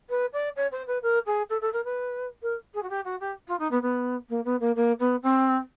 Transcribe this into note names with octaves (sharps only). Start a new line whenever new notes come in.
B4
D5
C#5
C5
B4
A#4
G#4
A4
A4
A#4
B4
A#4
G#4
F#4
G4
F#4
G4
F4
D#4
B3
B3
A#3
B3
A#3
A#3
B3
C4